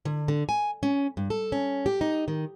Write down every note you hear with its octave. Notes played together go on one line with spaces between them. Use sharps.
D3
D3
G#5
C#4
G2
A4
C#4
G4
D#4
D#3